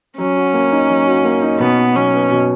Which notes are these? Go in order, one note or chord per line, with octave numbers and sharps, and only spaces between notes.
F#3 C#4
F#4
A#3
D#4
F#3
F#4
A#3
D#4
B2 B3
F#4
F#3 C#4
B3
B2